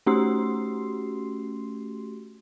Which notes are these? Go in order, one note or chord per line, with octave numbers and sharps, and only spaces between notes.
A3 C#4 F#4 G4 C6 C7